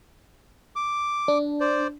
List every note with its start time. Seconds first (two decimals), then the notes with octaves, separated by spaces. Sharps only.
0.76 D6
1.28 D4
1.60 C5 D5